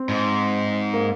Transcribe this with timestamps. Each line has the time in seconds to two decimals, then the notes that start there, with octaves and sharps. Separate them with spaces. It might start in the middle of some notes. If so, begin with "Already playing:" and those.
Already playing: C4
0.09 G#2
0.93 A#3